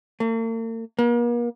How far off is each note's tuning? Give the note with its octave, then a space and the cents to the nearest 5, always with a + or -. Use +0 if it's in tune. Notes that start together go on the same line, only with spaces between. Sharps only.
A#3 -45
A#3 +40